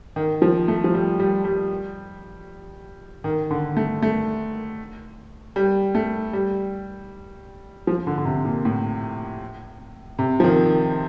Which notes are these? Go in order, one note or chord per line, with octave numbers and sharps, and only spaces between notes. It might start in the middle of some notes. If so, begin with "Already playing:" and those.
D#3
F3
A3
F3
G3
G3
G3
D#3
D3
A3
A3
G3
A3
G3
F3
D3
D3
C3
A#2
A2
C3
F3
D#3